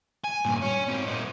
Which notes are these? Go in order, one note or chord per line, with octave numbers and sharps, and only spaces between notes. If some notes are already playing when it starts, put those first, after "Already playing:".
G#5
G2 A#2
C#4
G#2 C4
A#2 D#4